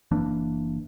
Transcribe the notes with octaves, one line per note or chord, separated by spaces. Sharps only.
F#1 E3 A#3 D4